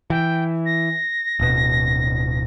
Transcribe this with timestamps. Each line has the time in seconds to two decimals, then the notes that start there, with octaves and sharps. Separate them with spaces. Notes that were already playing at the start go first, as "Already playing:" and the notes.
0.10 E3 G5
0.66 A#6
1.40 D1 B2